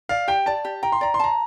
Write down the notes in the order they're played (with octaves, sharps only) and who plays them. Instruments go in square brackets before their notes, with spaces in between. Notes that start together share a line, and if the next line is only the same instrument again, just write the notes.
[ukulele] D5 [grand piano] F5
[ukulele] G4 [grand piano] G5
[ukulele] D5 [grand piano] A5
[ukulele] G4
[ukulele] G5 [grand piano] A#5
[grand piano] C6
[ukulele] D5 [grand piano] A#5
[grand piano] C6
[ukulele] A5 [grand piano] A#5